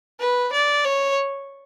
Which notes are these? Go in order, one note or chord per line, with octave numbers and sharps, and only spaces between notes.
B4
D5
C#5